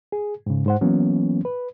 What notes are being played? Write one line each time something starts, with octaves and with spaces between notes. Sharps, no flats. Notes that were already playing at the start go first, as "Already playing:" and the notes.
G#4
G#2 C#3
G#2 C5 F#5
E3 F#3 A#3 B3 C#4
B4